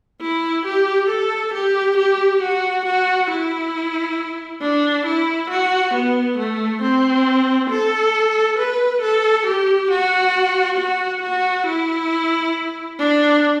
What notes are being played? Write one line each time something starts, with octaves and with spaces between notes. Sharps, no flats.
E4
G4
A4
G4
G4
F#4
F#4
E4
D4
E4
F#4
B3
A3
C4
A4
B4
A4
G4
F#4
F#4
F#4
E4
D4